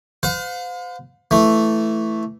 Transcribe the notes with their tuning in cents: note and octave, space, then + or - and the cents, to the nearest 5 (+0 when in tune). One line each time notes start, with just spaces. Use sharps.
C5 -40 F5 +40
E3 +0 A3 +0